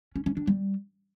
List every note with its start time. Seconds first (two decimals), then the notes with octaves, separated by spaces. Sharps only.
0.16 C#4
0.26 C#4
0.37 D4
0.47 G3